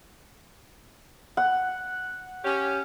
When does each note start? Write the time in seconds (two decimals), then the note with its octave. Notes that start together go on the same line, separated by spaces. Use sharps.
1.37 F#5
2.44 C#4 G4